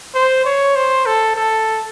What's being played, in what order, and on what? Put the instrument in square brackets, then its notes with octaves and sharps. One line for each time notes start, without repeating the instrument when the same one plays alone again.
[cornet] C5
C#5
C5
A4
A4